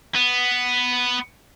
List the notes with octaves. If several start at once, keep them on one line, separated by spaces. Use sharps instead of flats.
B3